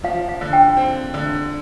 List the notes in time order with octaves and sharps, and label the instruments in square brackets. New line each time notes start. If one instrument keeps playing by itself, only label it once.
[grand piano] F3 [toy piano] F5
[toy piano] F5
[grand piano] D3
[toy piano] G5
[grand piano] C4
D3